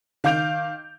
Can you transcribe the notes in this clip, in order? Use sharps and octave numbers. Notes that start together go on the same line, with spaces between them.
D#3 F5 D6 G6 D7 F7